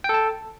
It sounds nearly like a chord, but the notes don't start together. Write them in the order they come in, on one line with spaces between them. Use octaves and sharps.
G5 A4 A5